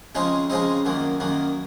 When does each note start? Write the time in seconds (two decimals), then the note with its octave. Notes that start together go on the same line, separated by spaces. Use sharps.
0.15 C#3 F3 G#3 C4 D#4
0.50 C#3 F3 G#3 C4 D#4
0.85 F#2 D#3 F#3 A#3
1.20 F#2 D#3 F#3 A#3